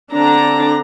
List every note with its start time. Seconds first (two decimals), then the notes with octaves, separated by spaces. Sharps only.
0.14 D3 C4 D4 A#5